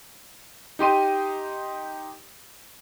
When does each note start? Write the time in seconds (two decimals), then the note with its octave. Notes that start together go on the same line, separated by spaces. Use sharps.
0.79 D#4 G4 C6 D#7